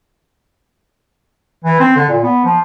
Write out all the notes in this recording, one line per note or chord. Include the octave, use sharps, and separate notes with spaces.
E3
C4
D3
A#2
B3
F3